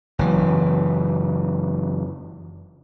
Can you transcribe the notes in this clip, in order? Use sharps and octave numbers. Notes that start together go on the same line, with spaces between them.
F#1 E3